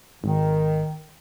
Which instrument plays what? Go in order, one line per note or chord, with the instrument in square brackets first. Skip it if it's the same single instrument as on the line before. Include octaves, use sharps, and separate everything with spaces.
[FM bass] G#1 [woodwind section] D#3